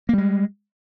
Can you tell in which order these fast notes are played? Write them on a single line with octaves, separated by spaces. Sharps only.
A#3 G3 G#3